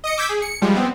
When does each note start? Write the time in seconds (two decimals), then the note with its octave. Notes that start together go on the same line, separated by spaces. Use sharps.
0.04 D#5 D#6 C#7
0.17 D6 E6 G6 G#6 B6
0.29 G#4
0.42 C#7
0.62 F3 G3 G#3
0.75 B3 C4